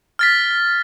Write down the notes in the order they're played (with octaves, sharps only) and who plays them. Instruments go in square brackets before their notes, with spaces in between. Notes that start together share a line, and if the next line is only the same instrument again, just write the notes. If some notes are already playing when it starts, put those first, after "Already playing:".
[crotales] F6 A6 B6